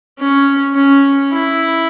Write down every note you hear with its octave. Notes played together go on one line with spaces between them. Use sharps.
C#4
C#4
E4